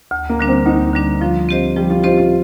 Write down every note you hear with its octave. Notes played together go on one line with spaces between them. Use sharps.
D2
A#3
D3 G3 D4
C4
D2 D#4
D3 G3 D4
F3 F4
C4 G4 C5 D#5
F3 G3
F4
C4 F4 G4 C5 D#5
F4